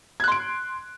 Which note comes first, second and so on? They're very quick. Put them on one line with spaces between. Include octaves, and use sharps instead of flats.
G#6 F#6 C6 D7